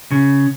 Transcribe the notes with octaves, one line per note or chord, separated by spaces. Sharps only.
C#3